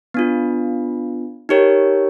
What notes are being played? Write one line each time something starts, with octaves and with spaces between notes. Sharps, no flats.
B3 D4 F4
D#4 G4 A#4 C#5